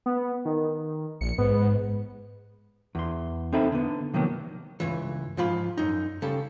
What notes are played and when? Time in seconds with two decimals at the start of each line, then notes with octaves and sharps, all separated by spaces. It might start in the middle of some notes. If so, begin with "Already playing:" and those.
0.06 B3
0.45 D#3
1.21 A#1 C#7
1.38 G#2 B3
2.95 E2 C6
3.53 C4 D#4 A4 E5 B5
3.72 D3 B3
4.14 C3 D#3 F3 F#3 A#3 B3
4.80 C#2 G2 E3
5.37 G#2 F3 F4 B5
5.77 F#2 D#4
6.22 C#3 G3 A4